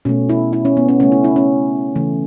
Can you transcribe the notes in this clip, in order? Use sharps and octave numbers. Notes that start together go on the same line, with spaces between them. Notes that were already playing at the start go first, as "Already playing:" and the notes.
B2 A3 C#4
E4
E4
C#4
B3
C#4
C#3 A3 C#4
E4
E4
C#4
C#3 E3 A3